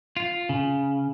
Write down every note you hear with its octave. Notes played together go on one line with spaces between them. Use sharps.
F4
C#3